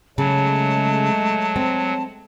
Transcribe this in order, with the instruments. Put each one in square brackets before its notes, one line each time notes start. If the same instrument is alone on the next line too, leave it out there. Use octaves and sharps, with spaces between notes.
[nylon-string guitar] C#3 [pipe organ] F#3 [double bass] G#3 A3 [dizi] A5
[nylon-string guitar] C4